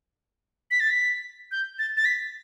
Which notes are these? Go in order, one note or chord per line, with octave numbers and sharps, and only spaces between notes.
B6
A6
B6
G6
A6
A6
B6